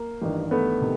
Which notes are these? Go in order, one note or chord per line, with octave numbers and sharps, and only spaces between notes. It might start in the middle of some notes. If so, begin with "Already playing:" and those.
Already playing: A#3
A1 G2 D#3
A3 B3
C3 D#3